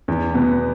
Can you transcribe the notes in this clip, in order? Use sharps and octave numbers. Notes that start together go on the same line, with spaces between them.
E2
B2 B3